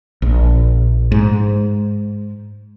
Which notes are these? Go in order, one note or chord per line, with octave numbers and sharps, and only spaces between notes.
A#1
G#2